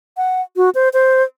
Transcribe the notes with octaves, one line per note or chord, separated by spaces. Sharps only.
F#5
F#4
C5
C5